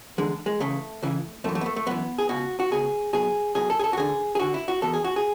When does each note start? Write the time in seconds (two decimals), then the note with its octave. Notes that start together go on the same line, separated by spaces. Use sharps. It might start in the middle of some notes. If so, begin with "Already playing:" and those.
0.18 E2 D3 G#3
0.46 G#3
0.60 C#2 C#3 E3 A3
1.02 C#2 C#3 E3
1.44 F#2 A3
1.49 E3
1.55 A3
1.61 B3
1.66 A3
1.76 A3
1.87 F#2 E3 B3
2.18 G#4
2.29 C#2 B2 F#4
2.60 F#4
2.71 C#2 B2 G#4
3.13 B1 B2 G#4
3.55 B1 B2 G#4
3.70 A4
3.79 G#4
3.84 A4
3.93 F#4
3.97 D2 D3 G#4
4.35 G#4
4.39 D2 D3 F#4
4.54 E4
4.68 F#4
4.82 E2 B2 A4
4.94 G#4
5.04 F#4
5.16 G#4